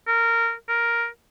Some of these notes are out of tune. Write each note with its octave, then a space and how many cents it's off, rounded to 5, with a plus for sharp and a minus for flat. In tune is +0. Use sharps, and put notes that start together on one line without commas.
A#4 -15
A#4 +5